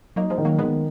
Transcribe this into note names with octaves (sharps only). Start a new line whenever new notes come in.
F#3 A#3 D#4
F3 G#3
D#3
F#3 A#3
D#3 G#3 B3